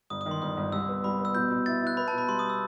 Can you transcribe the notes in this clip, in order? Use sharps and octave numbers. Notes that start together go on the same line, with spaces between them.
G1 D#6
D#6
D#3
C6
G1 D#6
G1
C2 E6
B3
C2 B5
B3 E6
B2 G6
B2
E4 A6
E4 F#6
B3 B5
A5
B2
B5
G3 C6
D#6
E6